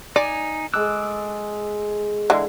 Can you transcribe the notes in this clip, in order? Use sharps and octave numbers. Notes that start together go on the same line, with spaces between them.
D#4 D5 G#5
G#3 A4 D6 E6 F#6
D3 E3 G#3